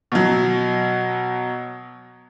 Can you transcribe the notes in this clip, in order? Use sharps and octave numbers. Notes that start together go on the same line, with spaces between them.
B2 F#3